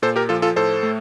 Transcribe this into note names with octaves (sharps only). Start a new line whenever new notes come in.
A#2 A4 C5
G4 A#4
F3 F4 A4
F4 A4
A2 A4 C5
A3